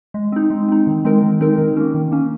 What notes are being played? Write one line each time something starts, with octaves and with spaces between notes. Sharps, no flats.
G#3
C4 D#4
G#3
C4 D#4
D#3
G#3 C4 D#4 A#4
D#3
G#3 C4 D#4 A#4
D#3
A#3 C#4
D#3
A#3 C#4